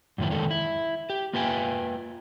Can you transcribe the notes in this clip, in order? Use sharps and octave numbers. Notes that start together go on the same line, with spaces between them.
F#2 A2 D#3 F3 E4
E2 D3 D#3 G#3 D4 A4
E4
G4
A#3 F4 B4 E5 G5 G#5